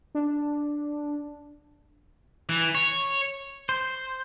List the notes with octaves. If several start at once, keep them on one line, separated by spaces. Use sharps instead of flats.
D4
E3
C#5
C5